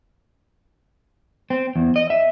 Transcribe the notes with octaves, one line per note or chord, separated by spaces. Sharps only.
C4
E2
D#5
E5